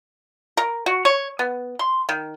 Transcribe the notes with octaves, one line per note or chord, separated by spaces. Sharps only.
A#4
F#4
C#5
B3
C6
D#3